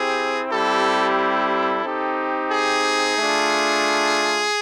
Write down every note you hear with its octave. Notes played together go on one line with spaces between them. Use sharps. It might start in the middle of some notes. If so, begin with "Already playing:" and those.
Already playing: C4 E4 G4 G#4
G3 C4 E4 G4 A4
A4
C4 D#4 G4
G#4
A3 D4 F4